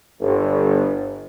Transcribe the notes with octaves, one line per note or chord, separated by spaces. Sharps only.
G1